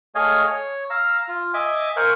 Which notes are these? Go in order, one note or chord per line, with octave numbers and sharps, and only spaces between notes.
A3 G#4 C#5 D#5 F5 G#5
C#5
F5 A#5 E6
F4
D#5 E5 G#5 D6
A#4 C5 F5 G#5 C#6 F#6